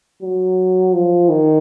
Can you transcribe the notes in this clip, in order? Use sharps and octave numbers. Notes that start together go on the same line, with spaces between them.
F#3
F3
D#3